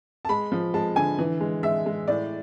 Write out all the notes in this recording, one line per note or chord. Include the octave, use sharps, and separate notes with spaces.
A5
G#3 B5
F3
G#3 A5
D3 G#5
E3
G#3
G#3 E5
G#3
A2 D5